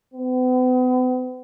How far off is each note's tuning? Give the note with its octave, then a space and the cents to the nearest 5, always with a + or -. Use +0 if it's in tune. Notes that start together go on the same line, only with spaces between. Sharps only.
B3 +45